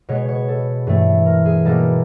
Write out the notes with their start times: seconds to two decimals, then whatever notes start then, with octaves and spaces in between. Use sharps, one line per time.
0.09 B2 G#3 B3 C#5
0.28 C#5
0.48 A4
0.87 G2 E3 A3
1.26 A#4
1.45 G#4
1.65 B2 G3 A#3 C#4 A4